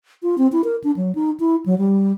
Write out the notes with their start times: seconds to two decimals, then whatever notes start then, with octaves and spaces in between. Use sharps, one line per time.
0.23 F4
0.38 C4
0.52 E4
0.64 A#4
0.84 D4
0.96 F#3
1.15 D#4
1.40 E4
1.66 F#3
1.78 G3